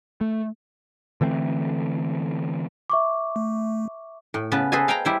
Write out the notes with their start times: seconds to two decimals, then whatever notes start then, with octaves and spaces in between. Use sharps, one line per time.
0.21 A3
1.21 D3 E3 A3 C4
2.90 E5 C#6 D6
3.36 A3
4.34 A2
4.52 C#3 B3 B4 A5
4.72 G#4 A4 B4 C5 D#5 G#5
4.88 F5 G5 G#5 A#5
5.05 G3 E4 C5